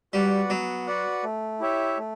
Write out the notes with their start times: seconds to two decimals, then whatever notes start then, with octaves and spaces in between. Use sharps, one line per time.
0.13 G3 F#4 B4 D5 F#5
0.50 F#3 B3
0.86 F#4 B4 D5 F#5
1.24 A3
1.60 E4 G4 C#5 E5
1.98 A3